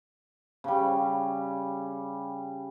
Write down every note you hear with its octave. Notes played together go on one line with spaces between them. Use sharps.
C#3 G3